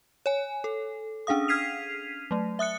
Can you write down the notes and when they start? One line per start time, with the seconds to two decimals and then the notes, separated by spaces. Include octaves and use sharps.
0.26 C#5 G#5
0.64 A4
1.27 C#4 D4 G#4 F5 D#6
1.48 F6 G#6 B6 C7 D#7 F7
2.31 F#3 A3
2.59 E5 D#6 F#6 C#7